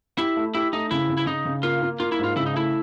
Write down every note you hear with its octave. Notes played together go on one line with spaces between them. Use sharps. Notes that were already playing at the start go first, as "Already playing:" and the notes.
E4 G4
A3
E4 G4
A3 D#4
C#3 E4
C#3
E4
C#3 D#4
C#3
A#3 F4
A#3
A#3 F4
E4
G#2 F4
C#3 E4
D#4
A3 E4